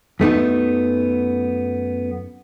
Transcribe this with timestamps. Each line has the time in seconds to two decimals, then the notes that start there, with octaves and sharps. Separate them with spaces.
0.20 F#2 A3 B3 D#4